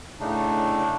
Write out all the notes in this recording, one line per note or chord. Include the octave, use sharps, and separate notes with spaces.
A2 C#3 A3 D4 D#4